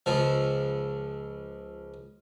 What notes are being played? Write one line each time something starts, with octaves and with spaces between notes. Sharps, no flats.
C#2 F3